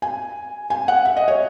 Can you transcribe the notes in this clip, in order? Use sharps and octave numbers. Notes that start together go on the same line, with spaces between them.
G#5
G#5
F#5
E5
D#5
C#5